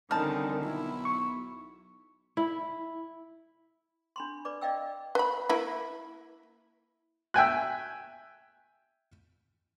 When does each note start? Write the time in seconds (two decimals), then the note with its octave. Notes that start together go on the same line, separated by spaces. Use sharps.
0.11 C2 D3 D#3 C#4 D#4 A5 F6
0.61 B1 E4
1.05 C#6
2.37 E4
4.16 D4 B5 C6
4.45 B4 D5 D6
4.61 D5 D#5 F5 G5 E6
5.15 B4 B5
5.49 A#3 E4 B4
7.34 E5 G5 G#5 F#6